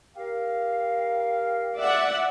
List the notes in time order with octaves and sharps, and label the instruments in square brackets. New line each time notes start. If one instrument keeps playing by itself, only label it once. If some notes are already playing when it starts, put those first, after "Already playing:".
[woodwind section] G4 A#4 F5
[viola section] D5 E5 F#5